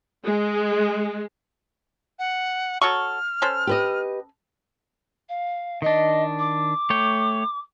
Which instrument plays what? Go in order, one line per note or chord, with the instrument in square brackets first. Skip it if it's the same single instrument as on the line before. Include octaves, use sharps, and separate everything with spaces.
[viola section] G#3
[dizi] F#5
[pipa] F#3 A4 C#6 [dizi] F6
[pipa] C#4 A4 C5
[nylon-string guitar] G4 B4 D#5
[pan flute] F5
[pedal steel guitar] D#3 D4 [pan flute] D#5
[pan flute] D6
[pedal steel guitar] A3 C#5 G5